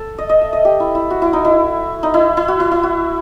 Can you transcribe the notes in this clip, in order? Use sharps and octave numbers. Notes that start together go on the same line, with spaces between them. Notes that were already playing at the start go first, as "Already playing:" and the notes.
Already playing: A4
D#5
D#5
E5
D#5
G4
E4
E4
F#4
E4
D#4
E4
D#4
E4
E4
F#4
E4
E4
F#4